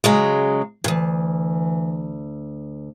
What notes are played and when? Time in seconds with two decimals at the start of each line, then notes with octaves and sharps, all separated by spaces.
0.04 C#3 F#3 G#3
0.84 D2 G2 E3